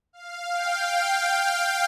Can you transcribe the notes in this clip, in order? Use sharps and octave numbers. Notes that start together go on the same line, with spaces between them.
F5
G5